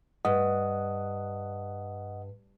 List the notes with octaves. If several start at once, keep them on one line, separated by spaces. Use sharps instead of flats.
G2 D#5 F#5 D#6